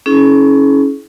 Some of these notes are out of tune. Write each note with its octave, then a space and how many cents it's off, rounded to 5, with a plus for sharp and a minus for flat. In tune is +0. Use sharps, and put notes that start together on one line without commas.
C#4 +0 E4 -30 G#4 +40